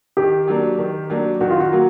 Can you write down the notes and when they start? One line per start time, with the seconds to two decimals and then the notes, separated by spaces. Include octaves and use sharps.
0.17 D#3 G4
0.48 F#3 A#3 D4
0.79 D#3
1.10 F#3 A#3 D4
1.41 D#3 F#4
1.51 F4
1.60 F#4
1.72 F#3 A#3